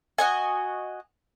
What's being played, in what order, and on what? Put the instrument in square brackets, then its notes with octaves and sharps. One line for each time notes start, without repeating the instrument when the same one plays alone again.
[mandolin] F#4 D#5 G#5